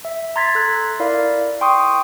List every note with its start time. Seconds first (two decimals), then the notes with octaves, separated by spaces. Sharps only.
0.05 E5
0.36 A#5 C6 G#6 A6 B6
0.55 A4 F#6
1.00 E4 A#4 D5 F5
1.61 G5 C6 C#6 D#6